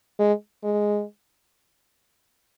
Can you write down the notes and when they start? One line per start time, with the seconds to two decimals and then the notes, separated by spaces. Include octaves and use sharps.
0.19 G#3
0.63 G#3